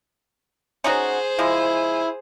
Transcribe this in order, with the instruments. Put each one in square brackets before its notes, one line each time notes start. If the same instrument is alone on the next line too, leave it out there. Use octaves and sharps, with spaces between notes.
[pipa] C#4 D#4 F#4 [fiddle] G#4 C5
[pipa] F3 G#3 [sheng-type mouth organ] E4